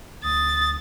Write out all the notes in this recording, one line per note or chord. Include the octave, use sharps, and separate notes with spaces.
D2 D#6 A6